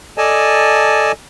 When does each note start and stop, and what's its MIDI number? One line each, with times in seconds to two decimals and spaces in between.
0.18 1.12 69
0.18 1.12 74
0.18 1.12 75
0.18 1.12 80
0.18 1.12 81